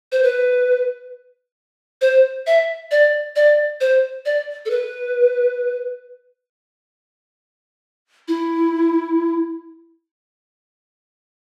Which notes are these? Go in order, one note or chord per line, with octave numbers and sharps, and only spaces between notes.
C5
B4
C5
E5
D5
D5
C5
D5
A4
B4
E4